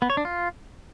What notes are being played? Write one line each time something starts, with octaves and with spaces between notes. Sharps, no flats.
B3
C#5
D4
F4